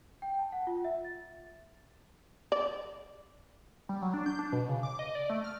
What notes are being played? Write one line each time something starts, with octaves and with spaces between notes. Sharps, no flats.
G5
A5
F#5
F4
E5
A6
D5
G3
F#3
D4
G6
D4
B2
C#3
D6
D#5
D5
A3
F6